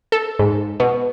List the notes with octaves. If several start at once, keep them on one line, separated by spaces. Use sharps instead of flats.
A4
G#2
B2